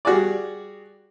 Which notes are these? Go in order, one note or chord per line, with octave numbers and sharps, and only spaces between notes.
G3 F#4 G#4 D5